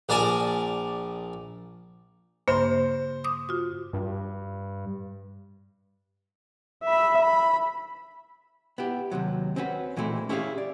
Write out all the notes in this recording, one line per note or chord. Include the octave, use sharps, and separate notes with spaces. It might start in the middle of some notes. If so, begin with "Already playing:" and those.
A#1 A#4 D5 G#5 A5
G2 C#3 A#3 C5
D6 D#6
F4 F#4
G2
E5 B5
B5
B3 E4 G4
D#2 G#2 C3 F#3
C4 C#4 E4 F#4 B4
A#2 E3 G#3 A3 C4 E4
C#4 E4 G4 G#4 D5 F5
D5